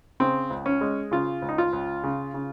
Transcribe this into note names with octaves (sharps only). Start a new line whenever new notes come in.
C#3 C4
C#2
C#4
G#3
C#3 F4
C#2
D#4
F4
C#2
C#3
C#3